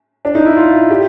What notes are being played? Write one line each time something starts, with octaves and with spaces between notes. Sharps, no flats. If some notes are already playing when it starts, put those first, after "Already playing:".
D4
D#4
E4
F4
G4